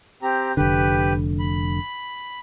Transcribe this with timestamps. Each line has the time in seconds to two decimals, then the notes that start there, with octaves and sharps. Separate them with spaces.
0.22 C4 G4 A#5
0.57 F1 D3 G4 B4 F#6
1.40 B5